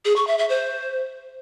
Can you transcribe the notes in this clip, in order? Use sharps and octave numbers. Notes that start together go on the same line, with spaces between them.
G#4
C#6
E5
E5
C5